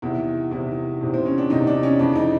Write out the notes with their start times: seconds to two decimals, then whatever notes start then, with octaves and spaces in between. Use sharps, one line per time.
0.02 E2 C3 D#3 E4
0.51 E2 C3 D#3 E4
1.01 E2 C3 D#3
1.14 C4
1.26 C#4
1.38 D4
1.50 E2 C3 D#3 D#4
1.67 D4
1.83 C#4
1.99 F2 C#3 E3 D4
2.16 D#4